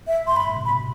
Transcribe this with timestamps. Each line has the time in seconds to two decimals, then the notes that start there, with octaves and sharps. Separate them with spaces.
0.07 E5
0.27 G2 C6
0.36 B5
0.46 A2
0.56 C3
0.65 B2 B5